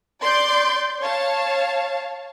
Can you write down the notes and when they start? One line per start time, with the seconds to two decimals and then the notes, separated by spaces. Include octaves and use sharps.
0.22 D5 C6 D6 G6
0.99 C#5 F5 A5